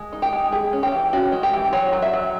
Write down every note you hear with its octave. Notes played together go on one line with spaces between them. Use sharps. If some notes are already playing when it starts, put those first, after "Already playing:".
Already playing: G#3
D#4
G4
G#3
G#3 G#4
C#4
G4
E3
C#4 F#4
G#3
G4
E3
F#3 C#5
F#3
E5
F#3